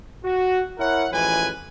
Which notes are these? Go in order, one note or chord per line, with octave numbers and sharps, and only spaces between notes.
F#4
E4 A#4 C#5 F#5
A1 E3 F3 G#3 B4 G#5